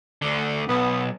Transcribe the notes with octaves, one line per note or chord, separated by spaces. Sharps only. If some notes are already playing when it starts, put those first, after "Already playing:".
D2 D3
B1 B3